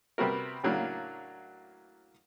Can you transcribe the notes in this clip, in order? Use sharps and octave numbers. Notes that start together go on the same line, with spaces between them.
C3 G3 B3 F#4 A#4
A2 C#3 F#3 A#3 D4